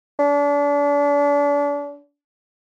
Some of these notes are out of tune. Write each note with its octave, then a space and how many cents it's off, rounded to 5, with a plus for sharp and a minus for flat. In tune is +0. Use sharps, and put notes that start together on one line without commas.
D4 -35